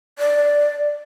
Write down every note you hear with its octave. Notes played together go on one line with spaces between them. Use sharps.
D5